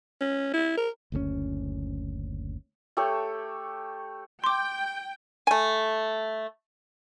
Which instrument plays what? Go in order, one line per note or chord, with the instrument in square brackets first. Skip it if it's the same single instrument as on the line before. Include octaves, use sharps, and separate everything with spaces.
[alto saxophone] C#4
E4
A#4
[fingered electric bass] F#1 D2 B2 C#4
[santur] A3 G4 A4 C#5
[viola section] G5 [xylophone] C6 D6
[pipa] A3 G#5